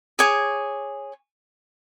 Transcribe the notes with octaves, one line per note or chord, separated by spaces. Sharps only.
G#4 C#5 G#5 D6